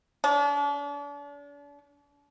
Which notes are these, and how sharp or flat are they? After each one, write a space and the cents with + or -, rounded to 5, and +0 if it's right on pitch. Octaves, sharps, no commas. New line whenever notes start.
D4 -40